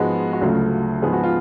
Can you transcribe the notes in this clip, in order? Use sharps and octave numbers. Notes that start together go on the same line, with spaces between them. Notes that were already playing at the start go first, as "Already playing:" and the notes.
Already playing: G#2 F3 G#3 B3 F#4
F#4
D2 C#3 F#3 A3 F4
G#2 F3 B3 G#4
F#4
F4